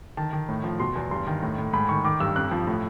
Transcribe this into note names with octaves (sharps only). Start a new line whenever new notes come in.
D#3 A5
D#3
A2
F3
B2 C6
E2
G2 C6
D#3
A2
A2
G#2 B5
D#3 C#6
D#3 D6
G2 E6
F2 F#6
F3
A2